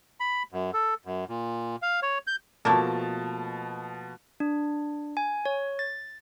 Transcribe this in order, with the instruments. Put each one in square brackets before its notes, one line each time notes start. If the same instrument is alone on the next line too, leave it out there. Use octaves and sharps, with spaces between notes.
[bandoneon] B5
F#2
A4
F#2
A#2
F5
C#5
G6
[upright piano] B2 F3 A5 [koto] A3 A#3 A#4
[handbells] D4
G#5
C#5
A6